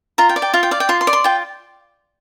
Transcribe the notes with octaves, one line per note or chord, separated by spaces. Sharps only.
F4 A#5
G5
D5
G5
F4 F5
G5
D5 F5
G5
F4 C6
C6
D5
C6
F4 G5